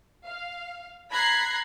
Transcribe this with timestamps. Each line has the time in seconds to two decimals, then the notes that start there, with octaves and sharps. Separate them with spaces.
0.24 F5
1.11 A#5 B5 F#6 G#6 B6 C7